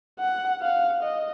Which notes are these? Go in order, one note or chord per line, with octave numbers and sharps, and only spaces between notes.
F#5
F5
D#5